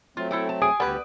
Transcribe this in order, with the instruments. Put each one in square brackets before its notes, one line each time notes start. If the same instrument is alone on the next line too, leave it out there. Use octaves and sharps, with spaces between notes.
[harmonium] F#3 A3 C4 [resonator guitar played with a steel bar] F4
[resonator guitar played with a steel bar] E4 A4 G5
A5
[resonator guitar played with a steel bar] G#4 [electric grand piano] G#5 D#6 D7
[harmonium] D2 G4 [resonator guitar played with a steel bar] G3 [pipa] B3 B4